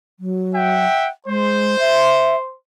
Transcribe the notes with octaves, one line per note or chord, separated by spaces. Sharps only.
F#3
E5 F#5 G5
G#3 C5
E5